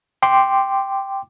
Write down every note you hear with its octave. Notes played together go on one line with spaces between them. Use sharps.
G5 C6 D6